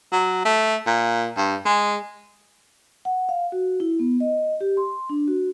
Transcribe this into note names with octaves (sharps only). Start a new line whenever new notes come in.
F#3
A3
A#2
G2
G#3
F#5
F5
F#4
E4
B3
D#5
G4
C6
D4
F#4